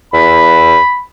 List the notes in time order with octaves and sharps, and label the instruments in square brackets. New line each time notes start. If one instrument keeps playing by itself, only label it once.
[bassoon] E2 [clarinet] B5